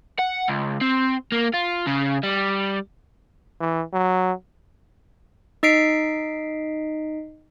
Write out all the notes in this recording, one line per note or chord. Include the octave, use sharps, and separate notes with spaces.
F#5
C#2
C4
A#3
F4
C#3
G3
E3
F#3
D#4 D#5 B6 C7 D7